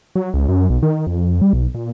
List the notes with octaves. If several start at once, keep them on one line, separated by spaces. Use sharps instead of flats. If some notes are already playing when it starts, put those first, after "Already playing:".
F#3
C#2
F#2
B1
D#3
F2
G3
B1
A#2